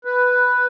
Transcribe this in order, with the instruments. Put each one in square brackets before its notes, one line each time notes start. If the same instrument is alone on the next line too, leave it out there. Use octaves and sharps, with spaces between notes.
[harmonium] B4